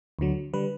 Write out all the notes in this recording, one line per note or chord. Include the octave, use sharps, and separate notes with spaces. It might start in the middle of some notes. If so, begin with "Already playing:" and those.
D2 D3 F#3
D3 G3 B4